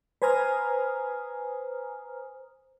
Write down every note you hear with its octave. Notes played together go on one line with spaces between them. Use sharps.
B4 C5 G#5 A#5 D#6 F6